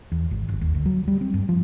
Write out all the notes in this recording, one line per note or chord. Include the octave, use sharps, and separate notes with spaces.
E2
G#1
G1
D#2
D2
F#3
G3
C4
G2
F3